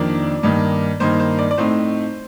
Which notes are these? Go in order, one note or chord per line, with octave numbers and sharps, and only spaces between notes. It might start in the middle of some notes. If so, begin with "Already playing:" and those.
Already playing: F2 D#3 A#3 D4 D5
G2 D#3 A#3 D#4
G2 D#3 A#3 D#4 C5
C5
D5
D5
A2 A3 C4 D#4 C5